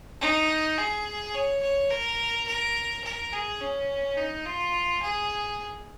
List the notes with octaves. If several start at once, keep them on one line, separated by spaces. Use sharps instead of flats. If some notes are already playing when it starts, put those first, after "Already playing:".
D#4
G#4
C#5
C#5
A#4
A#4
A#4
G#4
C#4
D#4
F4
G#4